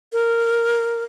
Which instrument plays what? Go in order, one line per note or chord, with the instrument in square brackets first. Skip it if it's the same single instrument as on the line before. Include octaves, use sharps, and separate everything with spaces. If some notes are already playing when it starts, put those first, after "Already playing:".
[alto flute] A#4